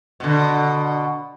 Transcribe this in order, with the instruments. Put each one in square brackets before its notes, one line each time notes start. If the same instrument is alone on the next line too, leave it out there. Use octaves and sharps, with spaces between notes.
[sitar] B2 D3